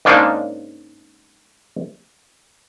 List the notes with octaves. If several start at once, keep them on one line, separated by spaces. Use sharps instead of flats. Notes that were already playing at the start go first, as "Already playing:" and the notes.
G#2 C#3 G#3 A#3 D4 D#4